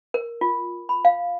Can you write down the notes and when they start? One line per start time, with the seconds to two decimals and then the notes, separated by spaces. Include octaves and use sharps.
0.14 A#4
0.41 F4
0.89 B5
1.05 F5